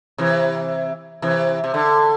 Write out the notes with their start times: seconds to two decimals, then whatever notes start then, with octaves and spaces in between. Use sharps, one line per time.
0.18 C3 E3
1.22 C3 E3
1.64 C3
1.74 D3